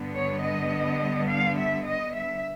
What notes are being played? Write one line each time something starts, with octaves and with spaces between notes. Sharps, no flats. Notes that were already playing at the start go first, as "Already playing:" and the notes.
Already playing: G2 D3 G3 B3
C#5
D#5
F5
E5
D#5
E5